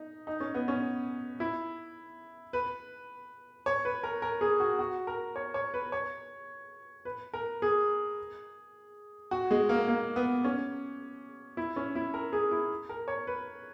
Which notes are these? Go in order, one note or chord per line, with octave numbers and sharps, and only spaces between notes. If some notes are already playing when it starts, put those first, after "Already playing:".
Already playing: D#4
D#4
C#4
B3
C#4
E4
B4
C#5
B4
A#4
A#4
G#4
F#4
F#4
A#4
C#5
C#5
B4
C#5
B4
A#4
G#4
F#4
G#3
A#3
A#3
B3
C#4
E4
C#4
E4
A#4
G#4
E4
A#4
C#5
B4